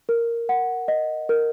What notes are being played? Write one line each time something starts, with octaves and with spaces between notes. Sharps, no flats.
A#4
F#5
D#5
A#4